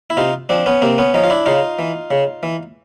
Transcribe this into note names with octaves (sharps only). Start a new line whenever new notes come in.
E4
C3 D#4 F4
F3 C4 D4
B3 C#4
C3 A#3 C4
B3 C#4
F3 C#4 D#4
F4
D4 E4
C#3 D#4 F4
E3
C#3
E3